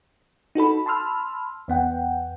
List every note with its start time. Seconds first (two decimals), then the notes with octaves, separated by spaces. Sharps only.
0.55 D#4 F#4 A4 B5
0.86 A5 B5 C6 E6 F6
1.68 E2 B3 F#5 G5